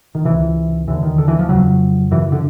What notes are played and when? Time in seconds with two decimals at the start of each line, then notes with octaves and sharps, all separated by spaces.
0.15 D#3
0.25 C#2 C3 E3
0.87 D#2 D3 E3
1.03 D#3
1.18 D3
1.28 E3
1.39 F3
1.49 F2 C#3 F#3
2.11 F#2 C#3 E3
2.32 D3